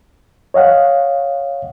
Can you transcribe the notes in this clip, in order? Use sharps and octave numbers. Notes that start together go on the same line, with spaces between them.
C#5 D#5 F5 F#5